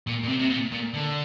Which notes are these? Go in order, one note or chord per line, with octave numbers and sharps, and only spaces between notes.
A#2
A#2
C3
C3
A#2
A#2
D3